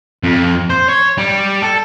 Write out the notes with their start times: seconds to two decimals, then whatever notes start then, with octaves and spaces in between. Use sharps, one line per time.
0.23 F2
0.70 C5
0.89 C#5
1.18 G3
1.62 A4